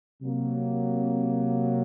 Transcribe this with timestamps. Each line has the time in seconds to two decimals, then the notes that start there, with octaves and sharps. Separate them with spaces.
0.21 C3 F#3 A#3